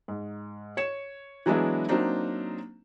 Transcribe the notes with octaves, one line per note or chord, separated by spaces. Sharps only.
G#2
C#5 C#7 E7
E3 F#3 G#3 B3 D4 E4
F#3 A#3 C4 D4 D#4